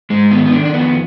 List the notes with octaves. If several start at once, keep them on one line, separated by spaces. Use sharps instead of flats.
G#2 G#3
D#3 B3
B3
D#3 D4
D4
F2 B3